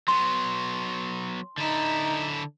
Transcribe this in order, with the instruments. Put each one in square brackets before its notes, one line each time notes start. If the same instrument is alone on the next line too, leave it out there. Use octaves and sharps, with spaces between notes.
[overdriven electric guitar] F#3 B3 [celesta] C6
[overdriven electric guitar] D3 E4 [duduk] D#4